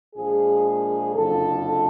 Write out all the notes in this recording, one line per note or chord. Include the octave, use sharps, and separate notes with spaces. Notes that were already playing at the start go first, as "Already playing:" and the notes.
A#1 A#2 F3 G#3 G#4
F#1 F2 D3 F3 A4